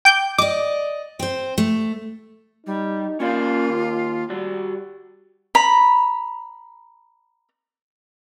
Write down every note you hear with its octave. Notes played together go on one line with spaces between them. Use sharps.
G5 D6 G6
D5 D#5 D6
C4 C5
A3
G3 D#4
A#3 C#4 F4 D5 F5
D#2
G3 F#4 D5
A#5 B5